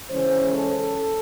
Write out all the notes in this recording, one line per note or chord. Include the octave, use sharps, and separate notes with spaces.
C#3 E3 G#3 C#4 C5
A4